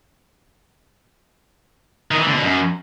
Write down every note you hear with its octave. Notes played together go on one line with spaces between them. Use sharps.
D#3
E3
D3
B2
F#2